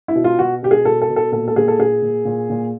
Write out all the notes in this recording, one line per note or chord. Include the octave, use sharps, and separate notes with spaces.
E4
B2
F4
B2 F#4
B2 G4
G#4
B2 A4
A4
B2
A4
A#2 A4
A4
A#2 G#4
A4
A#2 G#4
A#2
A#2
A#2